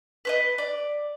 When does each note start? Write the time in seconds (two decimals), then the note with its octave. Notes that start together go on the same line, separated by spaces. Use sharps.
0.25 B4 C5 D#5
0.58 D5